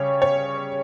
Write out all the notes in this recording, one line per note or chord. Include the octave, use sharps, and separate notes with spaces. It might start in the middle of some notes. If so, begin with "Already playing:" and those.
Already playing: C#3 G3 C#5
C#5